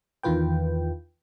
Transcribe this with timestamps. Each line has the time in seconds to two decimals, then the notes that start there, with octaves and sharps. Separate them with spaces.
0.23 E2 D#3 E3 F4 B4 G5